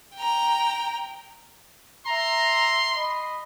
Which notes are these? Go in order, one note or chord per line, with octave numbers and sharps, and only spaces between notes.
G5 A#5
E5 A#5 C6
D#5 B5